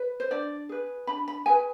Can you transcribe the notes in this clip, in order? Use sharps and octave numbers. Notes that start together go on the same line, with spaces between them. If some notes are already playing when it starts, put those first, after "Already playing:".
Already playing: B4
C5
D4 D5
G#4 B4
D4 B5
B5
G#4 B4 G#5